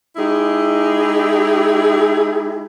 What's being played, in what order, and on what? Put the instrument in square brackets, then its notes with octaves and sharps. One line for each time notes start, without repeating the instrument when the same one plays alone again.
[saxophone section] G#3 D#4 E4 G4 G#4